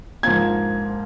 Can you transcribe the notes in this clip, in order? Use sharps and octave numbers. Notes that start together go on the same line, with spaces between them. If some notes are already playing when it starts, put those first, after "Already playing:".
G#2 F3 A#3 G#6